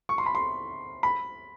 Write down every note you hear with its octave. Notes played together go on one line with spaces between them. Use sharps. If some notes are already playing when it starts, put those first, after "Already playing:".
C#6
C6
B5
C6
B5